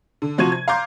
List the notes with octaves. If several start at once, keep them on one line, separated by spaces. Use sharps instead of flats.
D3
C3 F3 F#4 C#6 G#6 D#7
G#6
F5 A#5 C6 D6 G6